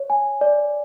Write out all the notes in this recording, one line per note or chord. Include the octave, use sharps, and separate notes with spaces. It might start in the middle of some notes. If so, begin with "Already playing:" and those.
Already playing: C#5
G#5
D5